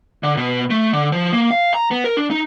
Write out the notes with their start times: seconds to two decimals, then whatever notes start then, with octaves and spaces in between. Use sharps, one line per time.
0.23 D3
0.37 B2
0.70 A3
0.93 D3
1.12 F3
1.33 A#3
1.51 F5
1.74 A#5
1.91 B3
2.04 A#4
2.17 D4
2.31 D#4